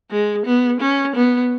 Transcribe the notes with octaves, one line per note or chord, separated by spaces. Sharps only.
G#3
B3
C#4
B3